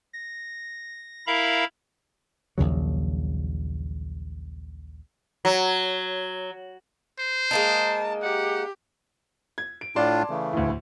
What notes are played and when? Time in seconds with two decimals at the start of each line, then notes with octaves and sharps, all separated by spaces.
0.13 A#6
1.27 E4 A#4 E5 F5 A#5 B5
2.58 A#1 D#2 C#3 F#3
5.45 F#3
7.19 C5
7.51 G#3 A#3 D#4 A5
8.22 G4 F#5
9.58 G#6
9.81 D7
9.96 A2 D4 F4 D5 A5 C6
10.30 C#3 E3 A3
10.53 D2 A2